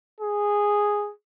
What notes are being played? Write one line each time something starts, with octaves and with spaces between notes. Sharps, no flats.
G#4